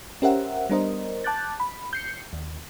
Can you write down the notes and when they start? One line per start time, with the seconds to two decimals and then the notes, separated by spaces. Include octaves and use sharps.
0.22 C#4 G4 A#4 C5 E5 F#5
0.70 G3 B3 D4 A#4 C5 D#5
1.24 A5 D6 F#6 G6 A6
1.60 B5
1.93 G6 C7 C#7
2.33 D#2